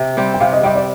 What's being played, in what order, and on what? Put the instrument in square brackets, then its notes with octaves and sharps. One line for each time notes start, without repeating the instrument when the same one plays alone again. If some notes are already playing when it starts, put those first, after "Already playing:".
Already playing: [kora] C3
G3 C4 G4
[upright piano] G5
[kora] C3 [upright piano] F5
[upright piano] D#5
[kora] G3 C4 G4 [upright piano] D#5
[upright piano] D5